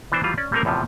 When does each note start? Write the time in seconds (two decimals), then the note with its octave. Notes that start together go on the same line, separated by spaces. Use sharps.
0.12 E3 B3 D4 C5
0.23 E3 F#3 G3 F4
0.38 C#4 D5
0.52 G3 A3 A#3 C4 D#4 A#4
0.65 E2 A2 C3 F3